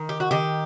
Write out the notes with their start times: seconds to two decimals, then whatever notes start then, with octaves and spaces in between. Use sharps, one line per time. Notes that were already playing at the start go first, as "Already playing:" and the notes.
Already playing: D#3
0.09 G4
0.20 F#4
0.31 D#3 G4